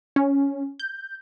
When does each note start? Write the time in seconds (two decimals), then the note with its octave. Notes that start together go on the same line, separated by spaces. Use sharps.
0.16 C#4
0.79 G6